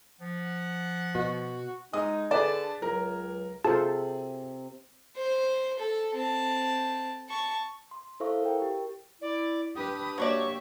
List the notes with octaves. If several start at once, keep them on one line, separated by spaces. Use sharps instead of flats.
F3 F#5
B2 F#4
G#3 D#4 D#6
D3 G#4 B4 D5 A5
C#2 F#3 A#4
C3 F4 G#4 A4 C5 A5
C5
A4
C4 A5
A5 C#6
C6
E4 A4 C5 E5 F5 C#6
A#4 G5
G4
E4 D5
D4 G4 B4 D#6
F#3 A#3 G4 C#5 D5 E5 C#6